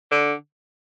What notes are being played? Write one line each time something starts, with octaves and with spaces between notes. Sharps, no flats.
D3